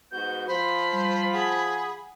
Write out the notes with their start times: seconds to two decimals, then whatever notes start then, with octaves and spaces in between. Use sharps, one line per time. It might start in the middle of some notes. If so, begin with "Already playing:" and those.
0.11 G#2 B3 F#4 G6
0.48 F3 C5 B5
0.93 G3
1.33 G#4 F#5